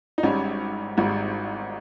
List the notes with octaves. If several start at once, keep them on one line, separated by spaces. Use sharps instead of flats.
D#4
G#1 G#2 G3 C#4
G#1 G#2 G3